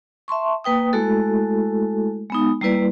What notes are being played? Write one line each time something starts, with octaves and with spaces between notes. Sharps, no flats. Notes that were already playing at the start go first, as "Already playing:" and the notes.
E5 A5 C6 C#6
A#3 B4 G5 D#6
G#3 A3 E4 F#4 A4
G#3 B3 D#4
G3 A#3 E4 B4 D5